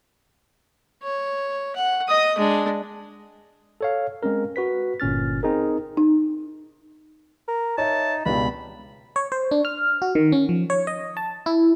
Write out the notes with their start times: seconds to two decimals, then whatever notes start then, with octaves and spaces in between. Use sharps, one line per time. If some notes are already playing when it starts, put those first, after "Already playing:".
1.03 C#5
1.76 F#5
2.08 D#5 D#6
2.38 G#3 D4
3.81 A4 C#5 F5
4.23 G#3 C4 C#4 A#4
4.56 F#4 B4 B6
5.00 G1 A#2 C#4 F6 A6
5.43 C4 D#4 G#4 A#4
5.97 D#4
7.48 A#4
7.78 D#4 C#5 E5 A5
8.26 C#2 G2 B2 B5
9.16 C#5
9.32 C5
9.51 D4
9.65 F6
10.02 F#4
10.15 D#3
10.32 C#4
10.49 F3
10.70 C#5
10.87 D#5
11.17 A5
11.46 E4